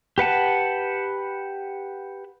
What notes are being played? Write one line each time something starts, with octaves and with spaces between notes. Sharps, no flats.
G4 B4 F#5 A5